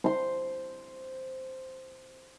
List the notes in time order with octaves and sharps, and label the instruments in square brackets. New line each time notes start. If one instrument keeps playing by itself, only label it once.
[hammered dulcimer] C5 C6